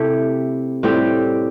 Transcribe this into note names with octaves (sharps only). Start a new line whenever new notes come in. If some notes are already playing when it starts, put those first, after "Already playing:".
Already playing: C3 A3 E4 G4
A2 G3 C4 G4